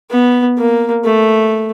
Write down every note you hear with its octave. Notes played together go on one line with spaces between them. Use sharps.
B3
A#3
A3